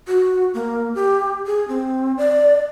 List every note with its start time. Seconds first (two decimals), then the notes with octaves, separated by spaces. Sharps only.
0.07 F#4
0.54 A#3
0.95 G4
1.46 G#4
1.68 C4
2.18 D5